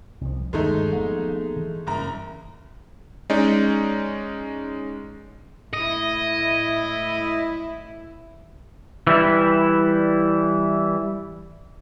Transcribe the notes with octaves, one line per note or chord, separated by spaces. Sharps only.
C2 F3
G1 D#2 G#3 A3 D#4
F3 A#3 B3
E3
F#1 G2 A#5
G#3 C#4 D#4 D5
A2 E4 D#5
E3 G3 E4